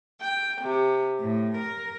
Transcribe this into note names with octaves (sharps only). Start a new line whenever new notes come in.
G5
C3
A2
A#4